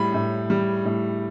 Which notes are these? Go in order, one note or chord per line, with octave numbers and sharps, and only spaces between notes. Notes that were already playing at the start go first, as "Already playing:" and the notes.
Already playing: A2 G3 B5
A2
G3
A2